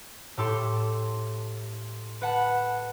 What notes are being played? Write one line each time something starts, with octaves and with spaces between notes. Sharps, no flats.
A2 G4 A4 C6 D6
B4 F#5 A5